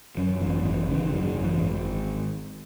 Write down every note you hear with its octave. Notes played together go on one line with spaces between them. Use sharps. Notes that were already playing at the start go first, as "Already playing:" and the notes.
F#2 F#3
G#1 E3
G#1 E3
C#3 E3
F#2 F#3
G#1
E3
G#1